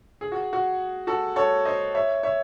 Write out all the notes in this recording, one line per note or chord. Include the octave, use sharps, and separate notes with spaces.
G#4
F#4
F#4
F#4 A4
A4 C#5
C5 D#5
C#5 E5
C#5 E5